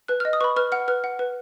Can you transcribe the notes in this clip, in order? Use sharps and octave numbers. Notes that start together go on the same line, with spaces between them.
B4 F#6
D#5 F6
D#6
B4 B5 C#6
B4 F6
F#5 F6
B4 F6
F#5
B4